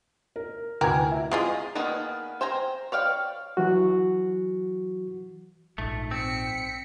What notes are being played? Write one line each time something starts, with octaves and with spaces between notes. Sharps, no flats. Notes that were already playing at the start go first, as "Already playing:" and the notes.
A#4
D2 E3 A#4 G5 G#5 G#6
E4
G#3 F4 G#4 D#5
D#3 A#3 B3 G#4 D5
C5 G5 G#5 A#5
C#5 D5 F5 G5
E3 F#3 F#4
A#1 G#2 A3
C4 B6 C#7